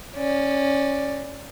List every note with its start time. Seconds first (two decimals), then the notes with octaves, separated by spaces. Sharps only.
0.16 C#4 D5